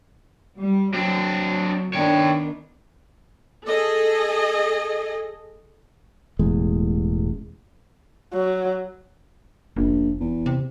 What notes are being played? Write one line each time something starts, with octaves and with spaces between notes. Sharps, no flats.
G3
F#3 C4 D4
D#3 B3 D4 C#5 G5
G#4 A4 D#5
E1 A1 E2 G#3
F#3
F1 A#1
E2
C3